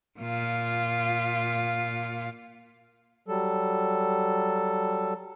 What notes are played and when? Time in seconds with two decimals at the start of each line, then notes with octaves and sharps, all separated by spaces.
0.20 A#2 F4
3.28 F#3 G3 A4